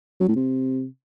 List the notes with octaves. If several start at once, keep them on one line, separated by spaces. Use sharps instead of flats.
F#3
A2
C3